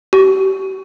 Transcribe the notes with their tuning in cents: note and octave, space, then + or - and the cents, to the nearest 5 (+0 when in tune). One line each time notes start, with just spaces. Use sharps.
G4 -40